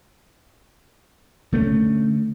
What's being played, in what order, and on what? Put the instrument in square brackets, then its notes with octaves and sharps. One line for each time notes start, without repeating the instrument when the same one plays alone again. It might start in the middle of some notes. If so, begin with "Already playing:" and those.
[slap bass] D3 A3 B3 C#4